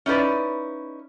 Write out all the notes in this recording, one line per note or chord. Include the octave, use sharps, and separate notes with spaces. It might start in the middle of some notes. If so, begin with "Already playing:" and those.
C#4 D#4 E4 B4 D5